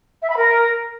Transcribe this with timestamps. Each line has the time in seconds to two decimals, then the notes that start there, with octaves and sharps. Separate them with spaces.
0.22 E5
0.30 B5
0.37 A#4